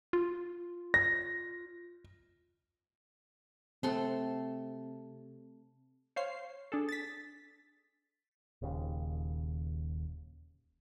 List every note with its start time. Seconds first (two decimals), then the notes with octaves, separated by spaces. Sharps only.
0.13 F4
0.94 A#6
3.83 C3 A3 C4 A4 C6
6.16 C5 C#5 F5 C7
6.72 D4 G#4 A4
6.89 A6 B6
8.62 D#1 D#2 C#3